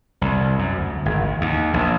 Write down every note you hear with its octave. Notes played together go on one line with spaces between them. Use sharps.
C2
F#2
D2
G#1
D2
D#2
A#1